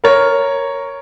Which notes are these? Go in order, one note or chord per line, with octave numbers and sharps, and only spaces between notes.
A#4 C#5